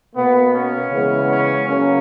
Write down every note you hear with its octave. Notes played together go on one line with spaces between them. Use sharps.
B2 A#3 B3
C#4
C#3 E3 G#3 B3
C#4
C#3 F#3 A#3 C#4